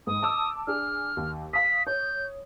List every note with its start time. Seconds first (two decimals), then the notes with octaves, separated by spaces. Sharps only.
0.07 G#2 D#6
0.22 A5 D6 E6
0.67 D4 G#4 F6
1.17 D#2
1.53 F5 D#6 B6
1.87 C#5 G6